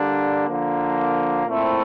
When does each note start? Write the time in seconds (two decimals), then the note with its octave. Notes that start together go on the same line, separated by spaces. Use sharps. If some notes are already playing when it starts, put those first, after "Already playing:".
Already playing: D3 G3 A#3 D4
0.47 D3 F3 A#3
1.46 A#2 A3 C4 E4